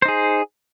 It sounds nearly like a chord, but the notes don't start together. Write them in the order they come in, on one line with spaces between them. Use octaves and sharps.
C5 D#4 G#4